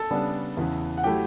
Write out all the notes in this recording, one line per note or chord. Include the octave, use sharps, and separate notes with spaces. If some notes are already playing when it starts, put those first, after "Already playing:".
Already playing: A4 A5
C#3 G3 B3 D4
E2 C#3 E3
F#5
F#3 A3 E4 G4 G5